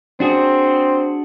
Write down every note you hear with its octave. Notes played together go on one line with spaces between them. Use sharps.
C4 D4 F#4 G#4